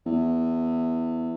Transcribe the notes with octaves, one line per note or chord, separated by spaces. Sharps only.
E2